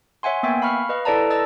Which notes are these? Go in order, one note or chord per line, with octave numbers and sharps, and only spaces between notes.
C#5 E5 F#5 G#5 C6
A#3 B3 E5 G5 G#5
F5 B5 C#6 F6
B4 D#5 F5
E4 A4 B4 D5 A5 A#5
D#5 A5 E6 A6